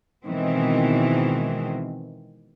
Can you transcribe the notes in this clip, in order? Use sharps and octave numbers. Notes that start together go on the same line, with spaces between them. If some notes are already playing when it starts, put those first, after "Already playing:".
B2 D#3 E3 G#3 C4